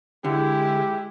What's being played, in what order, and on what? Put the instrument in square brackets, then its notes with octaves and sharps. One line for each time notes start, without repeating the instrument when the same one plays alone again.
[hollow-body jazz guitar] D3 [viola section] G#3 E4 [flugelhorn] G4